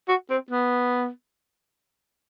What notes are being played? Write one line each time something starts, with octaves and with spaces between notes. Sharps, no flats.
F#4
C4
B3